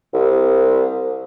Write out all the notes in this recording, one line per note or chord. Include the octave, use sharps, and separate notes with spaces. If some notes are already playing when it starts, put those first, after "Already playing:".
C2